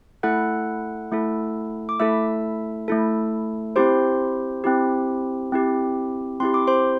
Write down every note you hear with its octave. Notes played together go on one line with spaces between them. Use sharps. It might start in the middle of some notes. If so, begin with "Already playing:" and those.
A3 E4 A4 F#5 F#6
A3 E4 A4
D6
A3 E4 A4 E5 E6
A3 E4 A4
C4 E4 G4 C5 C6
C4 E4 G4
C4 E4 G4
C4 E4 G4 C6
D6
C5 C6